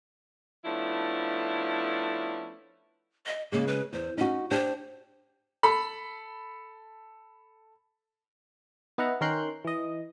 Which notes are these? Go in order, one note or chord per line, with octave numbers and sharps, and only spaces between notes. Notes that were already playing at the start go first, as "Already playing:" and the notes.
F3 A3 B3 C#4 D4 E4
D#5
C#3 G#3 A#3
B4
E2 C5
C#4 D#4 F#4
D4 G4 C5
A4 B5
B3 D#4 E5 F#5 A#5
D#3 C#4 A#4 C6 F#6 G6
E3 D#5